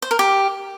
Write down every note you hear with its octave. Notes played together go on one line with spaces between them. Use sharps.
C5
A#4
G4